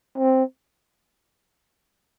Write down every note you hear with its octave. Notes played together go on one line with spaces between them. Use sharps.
C4